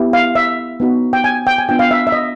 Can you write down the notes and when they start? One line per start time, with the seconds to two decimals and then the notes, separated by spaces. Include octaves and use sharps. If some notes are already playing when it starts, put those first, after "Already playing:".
Already playing: B3 E4 G4
0.13 F5
0.35 E5
0.80 B3 D#4 F#4
1.13 G5
1.24 G#5
1.47 G5
1.58 G#5
1.69 B3 D4 F4 G5
1.79 F5
1.91 E5
2.07 E5
2.12 D#5